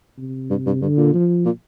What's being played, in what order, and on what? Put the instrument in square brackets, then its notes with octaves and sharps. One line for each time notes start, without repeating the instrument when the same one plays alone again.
[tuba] C3
[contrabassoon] G2
G2
[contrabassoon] G2 [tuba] D3
[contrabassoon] A#2
[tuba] F3
[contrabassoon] A#2